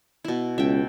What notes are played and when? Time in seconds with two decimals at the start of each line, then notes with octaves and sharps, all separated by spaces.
0.24 B2 E4
0.58 C#2 E5 G5